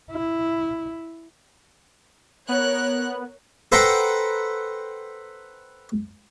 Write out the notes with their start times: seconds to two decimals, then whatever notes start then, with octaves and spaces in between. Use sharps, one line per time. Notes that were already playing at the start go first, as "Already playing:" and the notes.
0.11 E4
2.49 B3 A#4 C#5 F#6
3.72 A4 B4 C5 F#5 G5 A#5